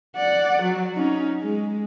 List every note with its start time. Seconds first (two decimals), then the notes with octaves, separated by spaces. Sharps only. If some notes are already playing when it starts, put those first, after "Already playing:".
0.16 D5 F#5
0.63 F#3
0.95 C#4 D#4
1.42 G#3